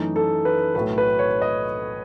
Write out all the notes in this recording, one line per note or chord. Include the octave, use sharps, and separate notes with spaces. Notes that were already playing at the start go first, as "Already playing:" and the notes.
Already playing: F#2 E3 A3 D#4
A4
B4
B1 A2 F#3 A3 B4
B4
C#5
D#5